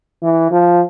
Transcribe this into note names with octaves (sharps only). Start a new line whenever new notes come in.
E3
F3